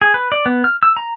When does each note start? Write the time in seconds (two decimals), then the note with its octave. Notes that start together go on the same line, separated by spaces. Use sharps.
0.02 G#4
0.14 B4
0.32 D5
0.46 B3
0.64 F6
0.83 E6
0.97 A#5